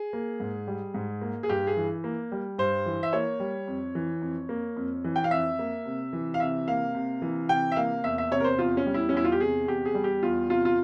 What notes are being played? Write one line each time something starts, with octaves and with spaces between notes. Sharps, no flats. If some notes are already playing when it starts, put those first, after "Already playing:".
Already playing: G#4
A#3
G#2
G3
G#2
A#3
G#4
G2 G4
G#4
E3
A#3
G3
G2 C5
E3
E5
A#3 C#5
G3
F2
E3
F2
A#3
F2
E3
G5
F5
F2 E5
A#3
C3
E3
F5
C3 E5
A#3 F5
C3
E3
C3 G5
E5
A#3 F5
E2 E5
E5
C3 C#5
A#4
C5
E2 F4
C#4
G3
E4
C#4
E2 E4
F4
G4
C3 G#4
E2 G4
G#4
G3
G4
E2 F4
C3 F4
F4